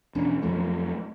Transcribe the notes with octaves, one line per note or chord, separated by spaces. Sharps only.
E1 C#4 D4
F2 F3 F#3 A3